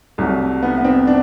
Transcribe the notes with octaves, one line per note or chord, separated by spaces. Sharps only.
C2 C3 F#3 A3
B3
B3
C4
D4